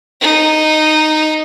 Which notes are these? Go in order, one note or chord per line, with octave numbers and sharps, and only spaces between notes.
D#4